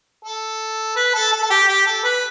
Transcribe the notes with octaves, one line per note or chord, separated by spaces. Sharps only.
A4
B4
A4
A4
A4
G4
G4
A4
B4